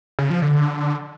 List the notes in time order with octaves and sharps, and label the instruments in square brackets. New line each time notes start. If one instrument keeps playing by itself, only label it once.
[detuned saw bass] C#3
F3
D3